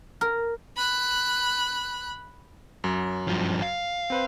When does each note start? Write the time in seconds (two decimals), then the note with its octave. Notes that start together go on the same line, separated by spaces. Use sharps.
0.21 A#4
0.77 B5 F#6
2.84 F#2 F#3
3.28 G2 F3
3.62 F5
4.10 C4 B4 C5